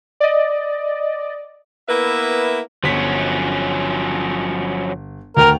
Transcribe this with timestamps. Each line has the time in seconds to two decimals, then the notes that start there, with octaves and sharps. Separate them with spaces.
0.20 D5 D#5
1.89 A#3 B3 E4 B4 E5
2.83 G1 F3 F#3 C#4 B6
5.37 D2 A#4 G5 F7